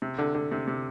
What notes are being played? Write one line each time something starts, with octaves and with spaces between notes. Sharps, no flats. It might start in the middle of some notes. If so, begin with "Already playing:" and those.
C3
D3
D3
C3
C3